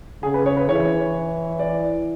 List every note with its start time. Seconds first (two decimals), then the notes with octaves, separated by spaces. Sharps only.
0.23 C#3 G#4
0.34 B4
0.46 C#5
0.57 B4
0.69 E3 C#5
1.59 D5